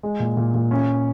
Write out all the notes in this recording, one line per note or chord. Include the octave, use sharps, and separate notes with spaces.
G#3
A#2
A#2
A#2
C#4